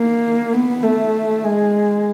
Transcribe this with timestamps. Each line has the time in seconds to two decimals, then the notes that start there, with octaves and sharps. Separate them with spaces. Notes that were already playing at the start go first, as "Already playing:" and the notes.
Already playing: A#3
0.53 B3
0.83 A3
1.44 G#3